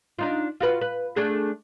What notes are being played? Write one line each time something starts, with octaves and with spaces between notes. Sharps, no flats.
D4 D#4 F4
F4 F#4 B4
B4
A3 D4 G#4